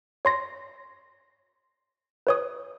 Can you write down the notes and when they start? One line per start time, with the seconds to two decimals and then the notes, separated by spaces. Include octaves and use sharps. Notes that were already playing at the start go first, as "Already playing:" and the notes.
0.25 C#5 C6 A#6
2.27 B4 C#5 D#6